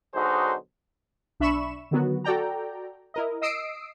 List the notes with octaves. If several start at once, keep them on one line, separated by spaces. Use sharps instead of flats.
B1 D3 D#4 F#4 G#4 C5
B1 D4 E5 B5 C#6 E7
D3 D#3 F#3 B3 F#4
F#4 A4 D5 G5 A#5
E4 A#4 D#5
D#5 D#6 E6 C7 D7